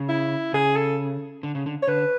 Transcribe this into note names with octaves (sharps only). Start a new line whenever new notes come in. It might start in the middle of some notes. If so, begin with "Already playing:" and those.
Already playing: C#3
E4
C#3 G#4
A4
D3
C#3
D3
C#5
D3 B4